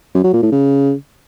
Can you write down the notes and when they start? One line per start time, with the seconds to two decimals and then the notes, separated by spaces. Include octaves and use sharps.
0.15 F#2
0.24 F#3
0.33 A#2
0.42 A2
0.52 C#3